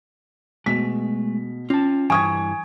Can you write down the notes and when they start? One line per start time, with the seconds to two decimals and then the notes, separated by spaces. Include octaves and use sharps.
0.66 B2 G#3 A3 B6
1.70 C#4 F4 A5
2.10 G2 E3 G#5 C#6 D#6 G#6